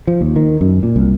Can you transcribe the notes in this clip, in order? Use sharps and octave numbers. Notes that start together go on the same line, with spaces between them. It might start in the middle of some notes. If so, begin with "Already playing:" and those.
F3
D#2
D#3
F#2
A#2
C2